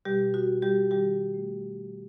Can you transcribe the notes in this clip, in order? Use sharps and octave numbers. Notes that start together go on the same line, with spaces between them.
B2 G3 G4
F#4
B2
G3 G4
D#3 G3 G4
A3